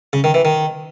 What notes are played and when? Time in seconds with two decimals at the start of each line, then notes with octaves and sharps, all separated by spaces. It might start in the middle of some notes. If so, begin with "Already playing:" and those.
0.13 C#3
0.24 D#3
0.34 E3
0.45 D#3